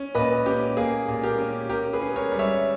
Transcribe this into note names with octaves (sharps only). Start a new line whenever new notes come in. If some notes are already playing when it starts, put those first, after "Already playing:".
Already playing: C#4
A#2 B4 D#5
C#4 G4
A#3 G#4
A#2
G4 A#4
C#4
C#4 G4 A#4
G#4 B4
C#4
A#4 C#5
G3
C#5 E5